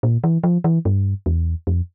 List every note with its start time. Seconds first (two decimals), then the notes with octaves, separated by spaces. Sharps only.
0.03 A#2
0.24 E3
0.44 F3
0.64 E3
0.85 G2
1.26 E2
1.67 F2